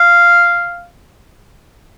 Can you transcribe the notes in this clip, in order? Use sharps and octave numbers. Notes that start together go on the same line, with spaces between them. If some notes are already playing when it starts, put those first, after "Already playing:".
Already playing: F5